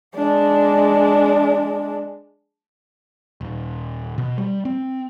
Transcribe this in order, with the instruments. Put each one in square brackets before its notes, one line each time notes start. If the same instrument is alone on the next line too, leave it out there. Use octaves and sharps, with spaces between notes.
[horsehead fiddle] G#3 D4
[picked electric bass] D#1
B2
G3
C4